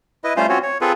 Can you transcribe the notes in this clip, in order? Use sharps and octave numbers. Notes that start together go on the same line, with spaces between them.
E4 B4 D#5
G3 A3 C#4 F4 C5 F5
C4 C#4 F4 F#4 C#5
C#5
C4 F4 G#4 A4 B4